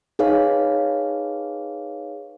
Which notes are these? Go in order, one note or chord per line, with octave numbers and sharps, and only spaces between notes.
D#4 G#4 B4 C#5 F5